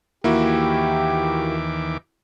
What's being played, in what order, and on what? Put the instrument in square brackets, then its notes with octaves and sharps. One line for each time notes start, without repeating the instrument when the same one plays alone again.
[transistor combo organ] D#2 E3 D6 [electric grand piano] A#3 E4 F#4 [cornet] G4